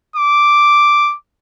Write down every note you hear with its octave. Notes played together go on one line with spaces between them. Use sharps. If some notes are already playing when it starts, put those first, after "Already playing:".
D6